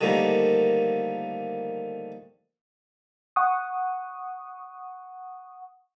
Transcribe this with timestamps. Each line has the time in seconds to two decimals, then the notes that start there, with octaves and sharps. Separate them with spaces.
0.01 D3 D#3 F3 G3 A3 A#3
3.36 F#5 C#6 D#6